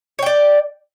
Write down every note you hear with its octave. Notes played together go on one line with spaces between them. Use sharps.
C#5 D5 G5